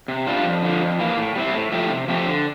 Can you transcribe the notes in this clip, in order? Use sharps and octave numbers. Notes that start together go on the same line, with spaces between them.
C3
G3 D4 F4
F2
D3 F3
F2
E3 A#3
A2
G3 C4 E4
A2
F3 A3 E4 G4
C3
F3 A3 C4 G4
D3